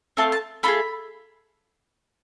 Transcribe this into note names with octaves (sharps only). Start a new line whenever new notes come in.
A3 C4 F4 A5
A5
A3 D4 F4 G#4 B5